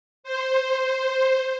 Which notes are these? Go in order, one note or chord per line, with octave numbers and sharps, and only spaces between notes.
C5